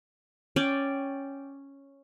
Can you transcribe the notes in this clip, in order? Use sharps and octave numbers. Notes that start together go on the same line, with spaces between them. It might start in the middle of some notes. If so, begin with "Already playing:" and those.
C#4 D5 G5